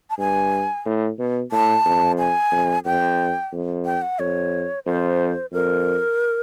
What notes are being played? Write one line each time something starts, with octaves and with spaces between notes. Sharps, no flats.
A5
G2 G#5
A2
B2
A2 A5
F2
G#5
F2
F2 G5
F2
G5
F#5
F2 C#5
F2 C5
F2 A#4